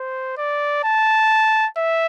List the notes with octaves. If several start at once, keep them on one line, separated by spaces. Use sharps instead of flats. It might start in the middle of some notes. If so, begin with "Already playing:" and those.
Already playing: C5
D5
A5
E5